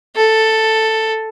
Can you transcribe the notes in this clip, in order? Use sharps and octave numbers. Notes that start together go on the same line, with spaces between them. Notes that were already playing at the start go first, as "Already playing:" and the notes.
A4